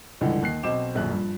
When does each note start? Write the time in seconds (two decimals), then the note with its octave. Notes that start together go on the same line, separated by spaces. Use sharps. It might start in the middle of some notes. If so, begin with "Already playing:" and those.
0.21 C#2 G2 D3 E3
0.42 D#2 F#6 C7
0.63 B1 B2 C4 C5 D6 E7
0.94 D#1 A#1 F#2 F#6
1.10 G2 F3